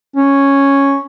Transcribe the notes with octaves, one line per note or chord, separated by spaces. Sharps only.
C#4